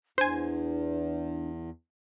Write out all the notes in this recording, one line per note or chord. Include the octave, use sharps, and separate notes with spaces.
E2 D4 C5 G#5